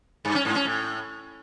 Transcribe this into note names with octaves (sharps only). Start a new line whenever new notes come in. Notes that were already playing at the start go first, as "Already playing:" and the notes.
G2
C#4
G#2
C#4
A2